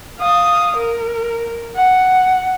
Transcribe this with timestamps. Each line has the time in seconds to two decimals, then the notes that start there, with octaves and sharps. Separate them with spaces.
0.19 F5 D#6
0.76 A#4
1.76 F#5